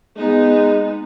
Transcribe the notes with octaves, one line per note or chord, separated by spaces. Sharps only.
G#3 B3 D#4